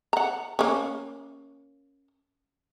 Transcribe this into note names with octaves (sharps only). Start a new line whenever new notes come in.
F#5 A#5
A#3 C#4